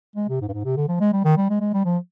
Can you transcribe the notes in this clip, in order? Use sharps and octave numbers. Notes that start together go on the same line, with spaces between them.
G#3
C3
G#2
G2
G#2
C3
D3
F3
G#3
G3
D#3
G3
G#3
G#3
G3
F3